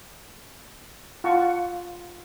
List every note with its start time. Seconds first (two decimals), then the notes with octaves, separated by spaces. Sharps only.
1.24 F4 F#5 A5 C#6